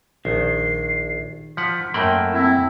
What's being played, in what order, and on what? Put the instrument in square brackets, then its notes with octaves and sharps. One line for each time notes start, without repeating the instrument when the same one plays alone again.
[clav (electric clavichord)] A#1 [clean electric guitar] D#3 [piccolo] C7
[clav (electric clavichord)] F3 F#5 [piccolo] B6
[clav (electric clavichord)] F#2 A3 A#3 [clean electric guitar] G5 B5 C6 [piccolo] A5
[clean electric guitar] C4 [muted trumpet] E4